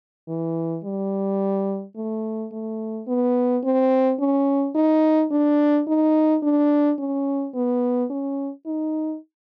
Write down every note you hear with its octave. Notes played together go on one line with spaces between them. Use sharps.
E3
G3
A3
A3
B3
C4
C#4
D#4
D4
D#4
D4
C#4
B3
C#4
D#4